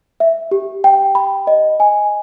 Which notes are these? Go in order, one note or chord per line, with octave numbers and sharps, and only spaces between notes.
E5
G4
G5
B5
D#5
G#5